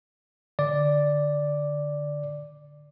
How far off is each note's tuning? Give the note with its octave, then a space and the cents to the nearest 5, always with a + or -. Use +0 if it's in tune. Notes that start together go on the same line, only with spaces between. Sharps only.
D3 +0 D5 +0